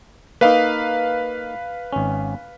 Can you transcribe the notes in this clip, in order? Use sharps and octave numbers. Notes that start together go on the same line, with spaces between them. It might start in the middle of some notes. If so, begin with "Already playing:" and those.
A#3 D#4 B4 F5
G#1 C#4